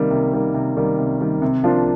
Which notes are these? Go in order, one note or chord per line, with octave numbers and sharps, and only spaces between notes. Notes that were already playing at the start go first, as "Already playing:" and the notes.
Already playing: C3 D#3 G3 A#3
C3
D#3 G3 A#3
C3
D#3 G3 A#3
C3
D#3 G3 A#3
C3
F3 A#3 D4 F4